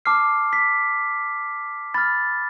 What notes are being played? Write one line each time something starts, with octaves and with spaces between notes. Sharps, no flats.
A5 D6 F6 C7
B6
B5 F6 A6